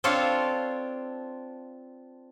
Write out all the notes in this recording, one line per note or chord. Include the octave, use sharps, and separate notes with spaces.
C4 D4 F4 A4 C#5 F5